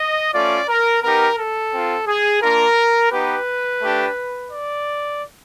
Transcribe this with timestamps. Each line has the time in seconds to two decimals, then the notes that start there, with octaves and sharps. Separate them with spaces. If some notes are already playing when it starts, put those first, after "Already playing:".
Already playing: D#5
0.33 A3 C#4 F4 D5
0.68 A#4
1.03 B3 D#4 G4 A#4
1.38 A4
1.73 C4 F4
2.07 G#4
2.42 A#3 D4 F4 A#4
3.11 B3 D#4 G4 B4
3.82 A3 D4 G4
4.50 D5